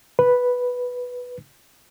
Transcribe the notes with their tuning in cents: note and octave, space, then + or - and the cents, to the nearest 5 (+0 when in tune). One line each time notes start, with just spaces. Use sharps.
B4 +0